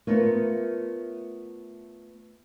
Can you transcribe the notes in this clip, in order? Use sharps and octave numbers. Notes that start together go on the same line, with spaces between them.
A3 B3 F4 A#4 C#5